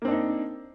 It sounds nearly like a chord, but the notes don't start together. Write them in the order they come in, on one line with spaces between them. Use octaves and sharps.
A#3 C4 D4 D#4